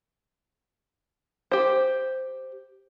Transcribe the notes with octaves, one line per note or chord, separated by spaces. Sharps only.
G4 C5